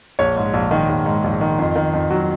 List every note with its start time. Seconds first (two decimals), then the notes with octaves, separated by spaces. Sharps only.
0.19 A#1 C#5
0.36 G#2
0.54 A#1
0.71 D#3
0.89 A#1
1.06 G#2
1.24 A#1
1.41 D#3
1.58 F2
1.76 D#3
1.93 F2
2.11 F#3